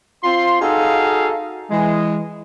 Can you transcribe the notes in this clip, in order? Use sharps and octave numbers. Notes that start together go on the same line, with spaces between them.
C4 F4 C6
D#4 F#4 G#4 A4 F5
E3 G#3